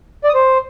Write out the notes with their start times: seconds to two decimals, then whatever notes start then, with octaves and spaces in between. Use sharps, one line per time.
0.24 D5
0.29 D#6
0.34 C5